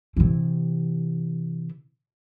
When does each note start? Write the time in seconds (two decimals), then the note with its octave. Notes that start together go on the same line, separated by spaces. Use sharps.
0.16 C3 E3